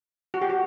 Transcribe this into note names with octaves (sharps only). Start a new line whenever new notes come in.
F#4
G4
F#4